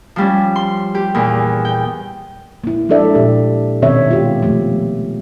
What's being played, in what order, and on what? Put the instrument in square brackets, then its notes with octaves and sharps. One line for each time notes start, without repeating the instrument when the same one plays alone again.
[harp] F3 G3 C#4
C6
G4
E2 A#2
G5
[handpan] A#3 E4
F3 G#3 D4 A4 D5 E5
A#2 G4 A4
B2 D#3 B3 C4 C#5 E5
G#3 F4 G4
F3 A3 B3